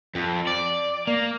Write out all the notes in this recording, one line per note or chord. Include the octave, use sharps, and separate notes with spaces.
F2
D5
A#3